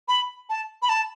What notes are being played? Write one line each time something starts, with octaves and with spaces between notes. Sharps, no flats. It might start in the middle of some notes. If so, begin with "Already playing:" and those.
B5
A5
B5
A5